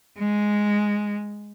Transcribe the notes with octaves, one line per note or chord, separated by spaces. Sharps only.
G#3